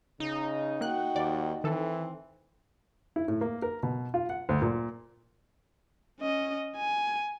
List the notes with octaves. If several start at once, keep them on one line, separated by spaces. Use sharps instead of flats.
C#3 D#4
A#3 F#4 G5 F#6
D#2 D5
D#3 E3 C4 A4
E4
A2
A#3
A#4
B2
F4
F#5
D2
A#2
C#4 D#5
G#5